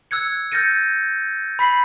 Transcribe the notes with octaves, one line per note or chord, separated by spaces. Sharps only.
E6 F#6 G#6 C#7
F6 G6 A6 A#6 C#7 D#7
B5 B6 C7 F#7